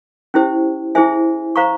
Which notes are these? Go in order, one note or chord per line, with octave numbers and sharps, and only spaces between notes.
C#4 E4 G4 C5
E4 G#4 C5 E5 G#5
C5 F5 A#5 C#6